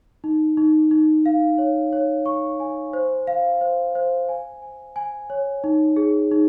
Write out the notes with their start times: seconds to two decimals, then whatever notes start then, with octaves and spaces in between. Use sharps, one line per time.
0.24 D#4
0.57 D#4
0.91 D#4
1.26 F5
1.58 C#5
1.93 C#5
2.26 C#6
2.60 G#5
2.93 C5
3.27 F5
3.61 C5
3.95 C5
4.29 G#5
4.62 G#5
4.96 G#5
5.30 C#5
5.64 D#4
5.97 G#4
6.31 D#4